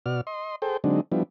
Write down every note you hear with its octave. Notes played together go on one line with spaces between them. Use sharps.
B2 F#4 D5 F6
D#5 C6
G#4 A4 C5 G5
D3 F#3 G#3 C4 D4 D#4
F3 G3 B3 D4 E4